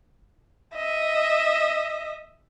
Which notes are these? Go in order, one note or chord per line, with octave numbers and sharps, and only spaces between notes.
D#5 E5